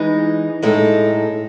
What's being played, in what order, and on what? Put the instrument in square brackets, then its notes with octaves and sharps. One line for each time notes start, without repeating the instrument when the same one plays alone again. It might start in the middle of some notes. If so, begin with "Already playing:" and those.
Already playing: [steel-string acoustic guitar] E3 G#3 D#4
A2 G#3 D#4 A4